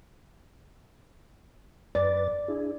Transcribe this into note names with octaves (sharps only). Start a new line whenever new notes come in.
F#2 B4 D5 A6
D4 E4 G#4